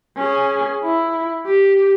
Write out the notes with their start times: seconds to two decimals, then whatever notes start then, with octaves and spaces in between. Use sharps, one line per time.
0.17 C#4 G#4
0.83 E4
1.46 G4